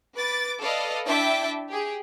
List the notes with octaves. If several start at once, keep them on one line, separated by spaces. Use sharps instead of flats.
B4 D6 A6
A4 B4 D5 D#5 F5
D4 E4 E5 G5 A5 D6
G4 G#4